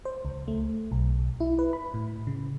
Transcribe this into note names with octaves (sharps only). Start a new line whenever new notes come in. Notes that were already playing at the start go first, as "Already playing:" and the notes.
C5
C#2
A3
B1
E4
B4
B5
A2
C#3